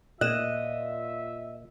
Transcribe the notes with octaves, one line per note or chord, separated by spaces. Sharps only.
A#2 F4 D#5 E5 F#6 E7